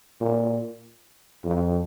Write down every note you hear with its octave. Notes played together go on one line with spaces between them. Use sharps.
A#2
F2